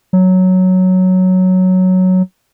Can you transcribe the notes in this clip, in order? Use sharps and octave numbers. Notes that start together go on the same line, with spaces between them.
F#3